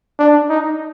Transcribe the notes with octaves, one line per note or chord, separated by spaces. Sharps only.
D4
D#4